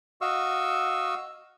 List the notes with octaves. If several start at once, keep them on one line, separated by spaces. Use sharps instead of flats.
F#4 D#5 F5 C#6 E6